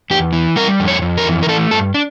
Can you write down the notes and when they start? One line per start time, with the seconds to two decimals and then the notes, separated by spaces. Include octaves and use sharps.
0.10 E2 G4
0.33 E3
0.56 G3 A#4
0.80 F2
0.88 C#5
1.02 F2
1.18 A#4
1.26 E3
1.43 A#4
1.48 A3 A4
1.71 G2 A4
1.94 D4